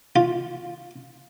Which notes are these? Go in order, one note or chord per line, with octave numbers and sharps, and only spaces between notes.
F4